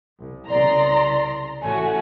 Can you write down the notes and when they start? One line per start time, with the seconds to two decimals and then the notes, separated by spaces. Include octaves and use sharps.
0.19 C2
0.50 C2 C#3 D5 A#5 C6 A#6
1.62 A1 A3 C#4 F#4 G#5